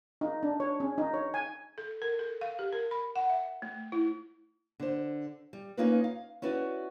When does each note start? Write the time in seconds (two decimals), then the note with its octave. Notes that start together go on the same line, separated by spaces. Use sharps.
0.21 D#4
0.43 D4
0.60 C#5
0.80 C#4
0.98 D#4
1.14 C#5
1.34 G#5
1.78 A4
2.02 A#4
2.19 A4
2.41 F5
2.59 G4
2.73 A#4
2.91 B5
3.16 F#5
3.30 E5
3.62 A3
3.92 E4
4.80 D3 C5
5.53 G3
5.77 A#3 C#4 D#4 F4 A#4 B4
6.04 F5
6.42 C#4 E4 F#4 B4 D5